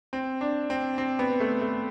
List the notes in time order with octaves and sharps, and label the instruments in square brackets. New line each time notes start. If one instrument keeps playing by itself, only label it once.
[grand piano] C4
D4
C4
C4
B3
A3
A3